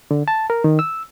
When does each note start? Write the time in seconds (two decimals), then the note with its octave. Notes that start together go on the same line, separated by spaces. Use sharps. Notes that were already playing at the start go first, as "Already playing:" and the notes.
0.11 D3
0.28 A5
0.50 A#4
0.64 D#3
0.79 E6